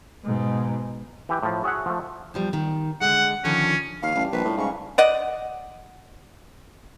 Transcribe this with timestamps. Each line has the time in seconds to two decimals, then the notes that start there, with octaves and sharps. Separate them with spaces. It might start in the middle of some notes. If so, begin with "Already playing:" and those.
0.24 G#2 B2
1.29 E3 G4
1.43 A2 F3
1.64 F#4 G#4 C#5 E5 F#5
1.86 F3 A3
2.34 E2 F3 G3
2.53 D#3
3.01 D3 G#3 F#5
3.45 D3 D#3 F3 C#4
4.02 D#2 F5
4.15 A1 G3 D4
4.32 A#1 B4
4.45 A2
4.58 G#2 C#3 C#4 F5 C#6
4.98 D5 D#5 F#5